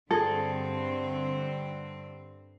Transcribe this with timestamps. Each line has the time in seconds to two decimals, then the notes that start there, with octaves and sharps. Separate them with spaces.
0.11 G2 D3 C4 G#4 A4